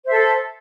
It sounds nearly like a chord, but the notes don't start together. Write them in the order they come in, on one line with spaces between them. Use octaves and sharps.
C5 E5 A4